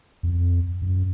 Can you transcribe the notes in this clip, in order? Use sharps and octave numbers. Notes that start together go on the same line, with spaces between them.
F2
F#2